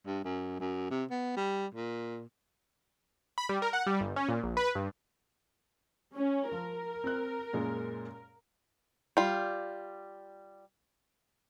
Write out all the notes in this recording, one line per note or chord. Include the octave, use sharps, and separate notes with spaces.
G2
F#2
F#2
C3
B3
G3
A#2
B5
G3
A#4
F#5
G3
G1
C#4
A#2
A#1
B4
G2
C#4
F3 A#4
C4 F#6
F#2 A#2 G#3
G3 F4